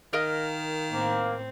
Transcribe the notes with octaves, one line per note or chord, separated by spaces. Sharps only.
D#3 A#4 D#5 F5
A2 A#3 C4